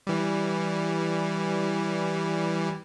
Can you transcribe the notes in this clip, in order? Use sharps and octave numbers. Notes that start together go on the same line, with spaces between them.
E3 G3